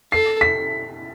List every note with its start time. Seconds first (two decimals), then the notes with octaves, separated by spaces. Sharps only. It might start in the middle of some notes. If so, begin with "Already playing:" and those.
0.12 A4 C7
0.41 B6